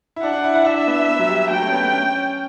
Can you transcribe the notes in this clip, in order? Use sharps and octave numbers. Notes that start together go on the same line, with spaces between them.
E4
D4 F#5
D4
E4
E4
D4 E5
B3
B3
F#3
G3
F#3 G5
A3
C#4
B3
A3
C#4
C#4